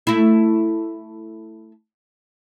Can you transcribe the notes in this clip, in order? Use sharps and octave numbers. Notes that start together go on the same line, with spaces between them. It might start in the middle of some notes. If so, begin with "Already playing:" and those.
A3 E4